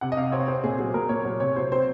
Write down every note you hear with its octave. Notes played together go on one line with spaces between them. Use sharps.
C3 F#5
D#5
C3 F5
C4 C#5
C4 C5
A#2 G#4
F#3 G#4
A#2 A#4
A#2 C#5
F#3 C#5
C3 C#5
F#3 C5
C4 C5